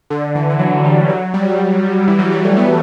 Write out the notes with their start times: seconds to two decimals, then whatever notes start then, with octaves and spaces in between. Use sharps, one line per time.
0.10 D3
0.35 E3
0.50 E3
0.59 F#3
0.84 G3
1.09 F#3
1.34 G3
2.08 E3
2.19 F#3
2.32 G3
2.44 A3
2.57 B3